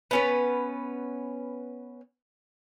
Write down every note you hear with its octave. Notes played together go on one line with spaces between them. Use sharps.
B3 C#4 B4